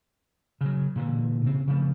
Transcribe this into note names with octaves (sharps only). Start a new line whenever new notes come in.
C#3 F#3
A#2 D3 E3
C#3 C4
C#3 F3 A3